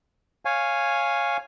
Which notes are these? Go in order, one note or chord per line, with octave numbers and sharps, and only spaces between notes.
C#5 F5 G#5